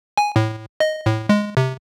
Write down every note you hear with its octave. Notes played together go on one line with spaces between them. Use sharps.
G#5
A2
D#5
A2
G#3
C3